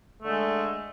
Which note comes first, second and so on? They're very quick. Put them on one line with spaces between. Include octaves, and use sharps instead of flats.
A3 D3 G#3